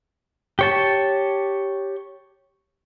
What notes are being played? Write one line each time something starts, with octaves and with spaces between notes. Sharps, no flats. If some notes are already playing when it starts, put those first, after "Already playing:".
G4 C#5 A5